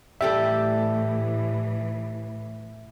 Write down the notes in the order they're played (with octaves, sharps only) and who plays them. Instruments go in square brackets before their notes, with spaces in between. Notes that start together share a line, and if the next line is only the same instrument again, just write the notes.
[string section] A2 E3 [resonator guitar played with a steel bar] G3 G4 A4 [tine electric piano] E5